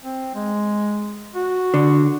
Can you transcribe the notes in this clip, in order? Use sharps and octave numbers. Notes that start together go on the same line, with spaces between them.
C4
G#3
F#4
D3